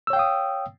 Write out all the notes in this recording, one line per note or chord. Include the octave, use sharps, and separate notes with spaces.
C#5 F5 G5 D#6 E6